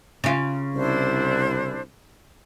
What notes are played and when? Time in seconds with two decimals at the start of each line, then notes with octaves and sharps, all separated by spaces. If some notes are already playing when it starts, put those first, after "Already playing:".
0.24 C#3 F4
0.75 C2 D4 E4 C5